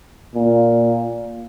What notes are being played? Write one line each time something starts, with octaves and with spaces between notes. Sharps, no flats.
A#2